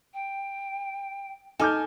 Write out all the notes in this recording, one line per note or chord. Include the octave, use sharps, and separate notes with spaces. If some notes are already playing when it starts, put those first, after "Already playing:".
G5
D#4 A4 G#5 D6 F6 G6